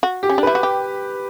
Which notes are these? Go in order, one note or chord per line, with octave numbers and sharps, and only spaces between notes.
F#4
G4
C#4
D4
E4 B4
F#4
G4